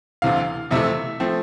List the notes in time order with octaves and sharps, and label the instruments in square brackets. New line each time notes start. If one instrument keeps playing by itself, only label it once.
[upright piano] D2 C3 E3 F5
F2 C3 E3 A3 E5
F3 A3 C4